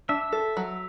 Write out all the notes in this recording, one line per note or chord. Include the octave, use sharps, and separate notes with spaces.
D4 E5
A4
F#3